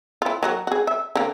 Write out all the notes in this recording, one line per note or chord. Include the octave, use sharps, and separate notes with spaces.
E4 F4
F#3 F#4 A#4
F#4 G#4
E5
D3 A#3